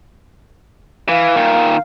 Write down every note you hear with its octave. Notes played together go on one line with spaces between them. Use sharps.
E3 F5
A#2 D#3